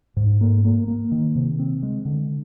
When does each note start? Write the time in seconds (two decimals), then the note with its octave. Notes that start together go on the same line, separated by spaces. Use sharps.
0.17 G#2
0.41 A#3
0.64 A#3
0.88 A#3
1.12 D#3
1.35 C3
1.59 C4
1.83 G#3
2.05 D3